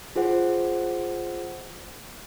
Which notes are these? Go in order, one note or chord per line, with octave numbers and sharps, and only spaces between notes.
F4 G#4 C5 F#5